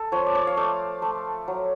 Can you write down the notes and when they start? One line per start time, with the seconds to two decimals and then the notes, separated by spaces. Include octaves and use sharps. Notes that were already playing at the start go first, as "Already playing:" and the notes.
Already playing: A4
0.12 F3 C#5
0.26 D5
0.35 C#5
0.47 F5
0.57 A3 D5
1.02 A3
1.48 F#3